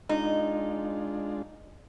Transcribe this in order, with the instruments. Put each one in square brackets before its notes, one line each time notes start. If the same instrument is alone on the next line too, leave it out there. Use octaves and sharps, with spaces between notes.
[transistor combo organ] G#3 D4 F4 [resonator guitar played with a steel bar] D#4